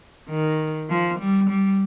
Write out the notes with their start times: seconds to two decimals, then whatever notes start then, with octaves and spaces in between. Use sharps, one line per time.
0.30 D#3
0.89 F3
1.19 G3
1.50 G3